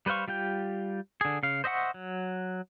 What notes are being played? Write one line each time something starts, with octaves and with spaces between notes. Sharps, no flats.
G3 B4 C5 F5 C#6
G3 F4 G4 G5
D3 G#4
C#3 F5
C5 D#5 E5 F#5 C#6
F#3